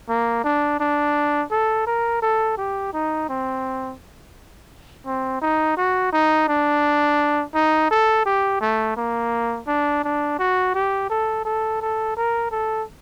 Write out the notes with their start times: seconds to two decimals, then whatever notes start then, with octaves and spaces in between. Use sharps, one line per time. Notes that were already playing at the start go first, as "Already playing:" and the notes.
0.09 A#3
0.44 D4
0.80 D4
1.51 A4
1.87 A#4
2.22 A4
2.57 G4
2.93 D#4
3.29 C4
5.06 C4
5.41 D#4
5.77 F#4
6.12 D#4
6.48 D4
7.55 D#4
7.91 A4
8.26 G4
8.61 A3
8.97 A#3
9.67 D4
10.04 D4
10.39 F#4
10.75 G4
11.10 A4
11.45 A4
11.81 A4
12.16 A#4
12.51 A4